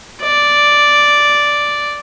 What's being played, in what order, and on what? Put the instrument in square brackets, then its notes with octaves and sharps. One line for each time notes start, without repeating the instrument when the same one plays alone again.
[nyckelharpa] D5